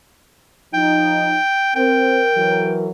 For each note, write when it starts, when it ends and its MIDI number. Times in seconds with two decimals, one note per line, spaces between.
0.74 1.37 53
0.74 1.37 63
0.74 1.74 79
1.76 2.23 60
1.76 2.87 70
1.76 2.79 79
2.36 2.91 52
2.36 2.91 54